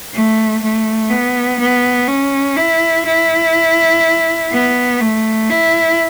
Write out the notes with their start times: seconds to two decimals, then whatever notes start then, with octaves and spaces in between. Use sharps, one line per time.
0.13 A3
0.62 A3
1.10 B3
1.59 B3
2.08 C#4
2.57 E4
3.06 E4
4.52 B3
5.01 A3
5.50 E4